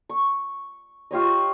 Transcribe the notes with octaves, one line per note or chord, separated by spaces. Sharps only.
C#6
F4 G4 C#5 D#5